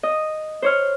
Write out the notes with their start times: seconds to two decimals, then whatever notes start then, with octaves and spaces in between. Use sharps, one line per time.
0.03 D#5
0.62 C5 C#5 F6